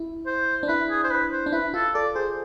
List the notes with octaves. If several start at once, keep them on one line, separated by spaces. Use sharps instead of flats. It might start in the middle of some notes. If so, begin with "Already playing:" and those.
Already playing: E4
C5
D4
E4 B4
G#4
C5
B4
C5
D4
E4 B4
F4 A4
A4 D5
G#4 C5